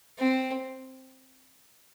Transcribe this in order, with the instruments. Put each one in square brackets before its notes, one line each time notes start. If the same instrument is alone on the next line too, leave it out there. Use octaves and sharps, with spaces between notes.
[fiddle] C4